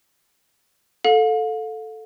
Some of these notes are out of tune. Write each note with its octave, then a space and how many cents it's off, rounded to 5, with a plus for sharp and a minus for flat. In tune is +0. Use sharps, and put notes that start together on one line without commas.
A4 +0 F5 +35